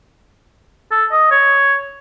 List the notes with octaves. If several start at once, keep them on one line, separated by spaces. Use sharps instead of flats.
A4
D#5
C#5